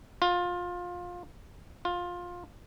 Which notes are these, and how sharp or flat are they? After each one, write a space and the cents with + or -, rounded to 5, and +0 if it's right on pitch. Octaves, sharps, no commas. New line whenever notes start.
F4 +20
F4 +15